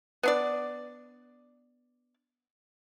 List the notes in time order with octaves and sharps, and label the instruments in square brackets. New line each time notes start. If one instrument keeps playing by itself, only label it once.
[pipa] B3 D4 D5